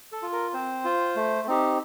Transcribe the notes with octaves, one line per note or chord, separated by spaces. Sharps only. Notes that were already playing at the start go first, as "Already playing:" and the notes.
A4
F4
A#4
C4 C5
F4
A3
C4 D#4 G4